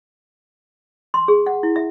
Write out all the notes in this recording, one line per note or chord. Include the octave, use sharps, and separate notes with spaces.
C6
G#4
F#5
E4
E5